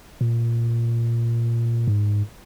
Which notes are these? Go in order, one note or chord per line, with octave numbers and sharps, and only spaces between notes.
A#2
G#2